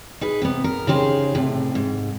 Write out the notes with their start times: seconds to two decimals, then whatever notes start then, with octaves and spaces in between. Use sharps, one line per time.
0.21 D#4 G#4 B4
0.42 C3 B3
0.64 A#4
0.87 C#3 D#4 G4 G#4 C5
1.35 A2 C3
1.75 G#2